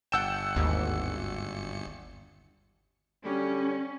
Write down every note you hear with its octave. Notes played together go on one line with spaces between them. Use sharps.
G1 F#5 G5 A5 E6 G6 C#7 E7
G#1 D#2
D3 F#3 G3 C#4